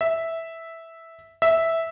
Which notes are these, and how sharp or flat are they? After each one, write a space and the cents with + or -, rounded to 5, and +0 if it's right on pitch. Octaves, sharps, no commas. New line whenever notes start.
E5 -5
E5 -5